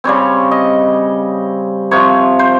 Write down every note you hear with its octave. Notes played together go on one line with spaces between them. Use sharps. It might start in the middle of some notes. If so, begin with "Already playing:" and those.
C#3 G3 C4 C#5
D#5
C3 F3 C4 C#5
C5